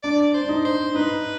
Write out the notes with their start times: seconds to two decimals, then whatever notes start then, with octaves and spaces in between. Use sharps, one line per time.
0.03 D4 D5
0.34 C5
0.41 D4
0.49 D#4
0.65 C5
0.95 D#4 B4